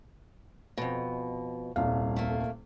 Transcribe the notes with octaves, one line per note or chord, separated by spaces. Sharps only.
F2 B2
D#1 C2 F5
A3 A#3